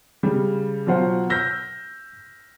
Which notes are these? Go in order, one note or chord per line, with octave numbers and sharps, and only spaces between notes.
C#3 G3
B2 F#3 F4 C5 F#5
E6 F6 G6 A#6 B6